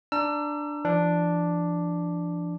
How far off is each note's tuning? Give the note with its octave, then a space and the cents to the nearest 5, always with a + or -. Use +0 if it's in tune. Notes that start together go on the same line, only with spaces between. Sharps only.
D4 +0 A#5 +0 E6 +35
F3 -40 D4 +0